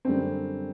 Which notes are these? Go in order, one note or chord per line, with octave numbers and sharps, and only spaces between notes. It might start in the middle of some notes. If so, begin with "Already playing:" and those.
F#2 D3 G3 C4